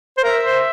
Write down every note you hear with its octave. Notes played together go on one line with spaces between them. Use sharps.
C5
A#4 E5
C5